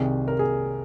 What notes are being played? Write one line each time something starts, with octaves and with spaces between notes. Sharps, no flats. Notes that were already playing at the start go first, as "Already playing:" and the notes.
Already playing: C2 C3 D#3 G#4
A#4
G#4